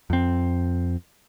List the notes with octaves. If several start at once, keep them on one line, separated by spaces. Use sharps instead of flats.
F2 C4